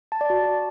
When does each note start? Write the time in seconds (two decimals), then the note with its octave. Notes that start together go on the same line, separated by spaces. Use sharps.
0.12 A5
0.21 D5
0.30 F#4